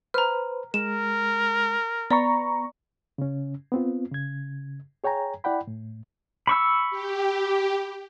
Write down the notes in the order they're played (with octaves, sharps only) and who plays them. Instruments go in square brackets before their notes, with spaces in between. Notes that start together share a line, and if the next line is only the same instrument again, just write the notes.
[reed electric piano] B4 C5 [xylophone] A#5 F6
[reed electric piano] G#3 [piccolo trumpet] A#4 [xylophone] E7
[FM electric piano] B3 A#5 C#6 [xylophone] D5 [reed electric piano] B5
[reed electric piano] C#3 C#4
B3 C4 F4
C#3 G#6
G#4 C#5 G5 G#5 A#5
E4 D5 F#5 G5 B5
A2
[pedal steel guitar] B5 C#6 E6
[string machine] G4